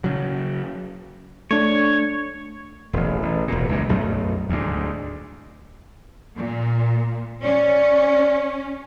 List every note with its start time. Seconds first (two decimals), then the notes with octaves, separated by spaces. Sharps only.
0.04 C#3 F#3
1.51 A3 D4 C#5
2.93 E1 A1
3.23 A1
3.48 E1 A#2
3.69 C#2 F#2 A#2
3.89 B1 F#2 F#3 A3
4.49 D2 G#2
6.37 A#2
7.43 C#4 D5